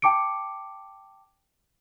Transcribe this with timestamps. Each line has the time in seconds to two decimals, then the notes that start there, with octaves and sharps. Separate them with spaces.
0.02 G5 A5 D6 C#7 D7